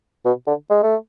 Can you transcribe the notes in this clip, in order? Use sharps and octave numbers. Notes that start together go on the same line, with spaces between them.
B2
D3
G#3
A3